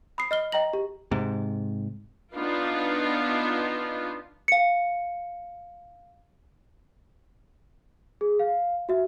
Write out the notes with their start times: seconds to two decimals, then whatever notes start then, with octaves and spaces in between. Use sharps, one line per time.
0.18 B5 D#6 C7
0.31 D#5 F6 G7
0.52 D#5 G5 A#5 A#6 F#7
0.73 G4
1.11 G#2 C3
2.33 B3 D4 D#4 F4
4.48 F5 C#7
8.21 G#4
8.39 F5
8.89 F#4 E5